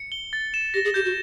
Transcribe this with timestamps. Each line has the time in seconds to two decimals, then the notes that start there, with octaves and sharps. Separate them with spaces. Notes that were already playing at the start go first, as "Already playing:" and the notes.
Already playing: C#7
0.12 G7
0.33 A6
0.54 E7
0.74 G4 A#6
0.85 G#4
0.94 G4 G6
1.05 F#4